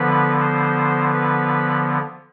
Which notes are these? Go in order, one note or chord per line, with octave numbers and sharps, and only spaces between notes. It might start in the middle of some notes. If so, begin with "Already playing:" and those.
Already playing: D3 F3 B3 B4
C5
B4